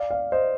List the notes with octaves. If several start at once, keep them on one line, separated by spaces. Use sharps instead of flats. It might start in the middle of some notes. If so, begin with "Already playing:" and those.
Already playing: D5 F5
D5 F5
C5 D#5